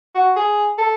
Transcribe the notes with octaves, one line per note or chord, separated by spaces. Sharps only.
F#4
G#4
A4